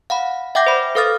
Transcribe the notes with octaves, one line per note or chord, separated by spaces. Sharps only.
F5 F#5 B5
E5 F#5 G5 D6 G6 A#6
C5 D5 B5
A4 B4 F5 D#6 F6 A6